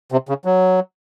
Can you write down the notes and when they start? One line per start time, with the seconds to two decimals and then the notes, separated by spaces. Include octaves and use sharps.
0.12 C3
0.29 C#3
0.45 F#3